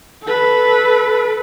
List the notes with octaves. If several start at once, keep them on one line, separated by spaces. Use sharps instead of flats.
A4 B4